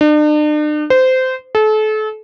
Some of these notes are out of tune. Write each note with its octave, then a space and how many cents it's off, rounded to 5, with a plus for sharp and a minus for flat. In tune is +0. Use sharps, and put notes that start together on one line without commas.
D4 +45
C5 -20
A4 -35